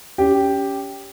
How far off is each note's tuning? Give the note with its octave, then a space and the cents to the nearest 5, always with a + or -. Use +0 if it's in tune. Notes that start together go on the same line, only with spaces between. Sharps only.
C#4 +20 G4 +0